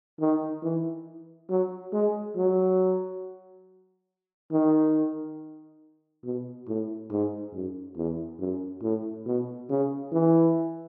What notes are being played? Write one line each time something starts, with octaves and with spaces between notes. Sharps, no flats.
D#3
E3
F#3
G#3
F#3
D#3
B2
A2
G#2
F#2
E2
F#2
A2
B2
C#3
E3